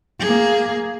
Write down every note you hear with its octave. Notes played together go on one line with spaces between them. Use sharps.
A#3 G#4